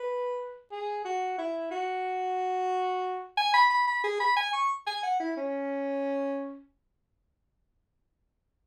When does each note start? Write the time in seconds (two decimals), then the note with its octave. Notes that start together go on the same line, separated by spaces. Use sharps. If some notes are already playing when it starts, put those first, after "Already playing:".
Already playing: B4
0.71 G#4
1.05 F#4
1.38 E4
1.71 F#4
3.37 G#5
3.54 B5
3.70 B5
3.87 B5
4.04 G#4
4.20 B5
4.37 G#5
4.53 C#6
4.87 G#5
5.03 F#5
5.20 E4
5.37 C#4